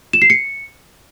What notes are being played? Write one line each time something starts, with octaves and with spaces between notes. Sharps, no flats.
E7
C7
C#7